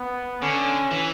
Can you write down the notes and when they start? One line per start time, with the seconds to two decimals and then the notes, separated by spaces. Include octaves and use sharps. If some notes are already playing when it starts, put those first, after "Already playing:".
Already playing: B3
0.42 D3 C#4
0.91 E3